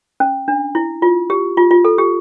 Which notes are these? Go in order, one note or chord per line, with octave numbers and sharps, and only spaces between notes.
C#4
D4
E4
F4
G4
F4
F4
A4
G4